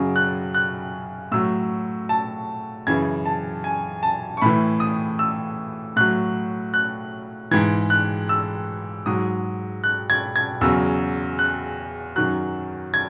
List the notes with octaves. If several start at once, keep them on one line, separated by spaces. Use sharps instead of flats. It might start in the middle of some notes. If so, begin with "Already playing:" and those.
Already playing: F#2 C#3 F#3
F#6
F#6
A2 F#3 E6
A5
F#2 C#3 E3 G#6
A5
G#5
A5
C#6
A2 E3 B5
D#6
E6
A2 F#3 F#6
F#6
G#2 E3 G#6
F#6
E6
G#2 F#3 D#6
F#6
G#6
G#6
E2 C#3 F#3 E6
F#6
F#2 D#3 F#3 F#6
G#6